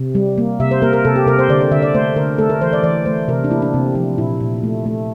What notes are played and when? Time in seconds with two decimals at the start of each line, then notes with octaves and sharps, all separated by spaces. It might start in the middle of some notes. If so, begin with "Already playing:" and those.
Already playing: C3
0.15 G3
0.38 A#3
0.60 C3 E5
0.71 C5
0.82 A#3 A#4
0.93 A#4
1.05 C3 A4
1.16 G4
1.27 C3 A#4
1.39 C5
1.49 D3 D5
1.61 D5
1.72 D3 E5
1.82 D5
1.94 A3 C5
2.16 D3 A#4
2.38 A3 A4
2.50 A#4
2.61 E3 C5
2.73 D5
2.83 E3 D5
3.06 A3 C5
3.28 C3 A#4
3.44 D4
3.51 A#3 E4
3.62 D4
3.74 C3 C4
3.95 F3 D4
4.18 A#2 E4
4.40 A#2
4.63 A3
4.86 A3